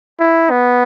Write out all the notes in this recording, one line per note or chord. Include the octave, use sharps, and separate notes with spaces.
E4
B3